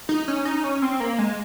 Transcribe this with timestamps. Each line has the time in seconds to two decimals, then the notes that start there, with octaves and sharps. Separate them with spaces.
0.09 D#4
0.28 C#4
0.45 D#4
0.64 C#4
0.82 C4
1.00 A#3
1.19 G#3